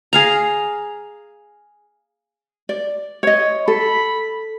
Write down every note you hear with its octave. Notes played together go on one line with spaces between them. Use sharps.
G#4 F5 A#5
D5
C#5 D#5
A4 B5